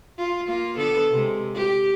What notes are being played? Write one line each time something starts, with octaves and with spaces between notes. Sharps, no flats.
F4
A#3 F4
D3 B3 A4
C3 G#3
G4